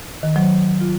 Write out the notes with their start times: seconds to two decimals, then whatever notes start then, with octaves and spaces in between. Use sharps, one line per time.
0.23 D#3
0.36 F#3
0.81 F4